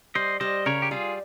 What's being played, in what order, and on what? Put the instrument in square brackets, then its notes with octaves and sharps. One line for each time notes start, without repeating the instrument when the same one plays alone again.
[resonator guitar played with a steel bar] G3 [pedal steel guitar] C5 D#5
[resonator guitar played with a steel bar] G3 [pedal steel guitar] C5 D#5
[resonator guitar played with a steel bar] C#3 [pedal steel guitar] A#4 C#5
[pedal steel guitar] G4
[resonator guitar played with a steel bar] G3 [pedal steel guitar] F4 G#4